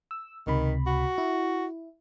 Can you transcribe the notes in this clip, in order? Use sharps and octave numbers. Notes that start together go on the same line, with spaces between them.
E6
C#2 C3 D#3 B5
F#4
E4